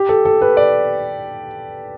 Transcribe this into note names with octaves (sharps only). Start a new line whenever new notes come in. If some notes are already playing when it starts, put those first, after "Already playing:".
Already playing: G4
A4
A4
B4
D5